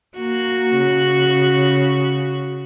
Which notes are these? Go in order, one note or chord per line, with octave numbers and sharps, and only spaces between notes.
A#3 F#4
C#3